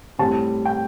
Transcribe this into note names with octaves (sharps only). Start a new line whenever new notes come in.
A2 G3 C4 A5
G5